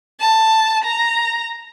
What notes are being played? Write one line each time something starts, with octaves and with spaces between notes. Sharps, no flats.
A5
A#5